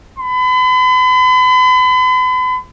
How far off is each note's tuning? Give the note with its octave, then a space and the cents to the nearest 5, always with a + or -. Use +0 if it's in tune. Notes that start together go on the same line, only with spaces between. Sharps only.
B5 +40